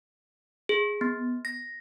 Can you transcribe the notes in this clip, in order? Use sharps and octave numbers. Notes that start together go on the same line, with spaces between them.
G#4
B3
A#6